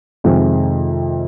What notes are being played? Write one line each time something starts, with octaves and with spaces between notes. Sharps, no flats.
F2 C3 D#3 G#3 C4